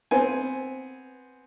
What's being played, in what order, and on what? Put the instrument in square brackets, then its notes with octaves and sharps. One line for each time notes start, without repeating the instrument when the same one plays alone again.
[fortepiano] B3 C4 G#5